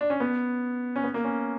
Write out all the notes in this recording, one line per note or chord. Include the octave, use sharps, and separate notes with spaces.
D4
C#4
B3
C#4
B3
A#3
C#4